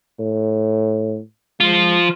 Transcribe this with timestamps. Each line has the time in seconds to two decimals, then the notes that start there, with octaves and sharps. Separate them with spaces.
0.19 A2
1.60 F3 G#3 F4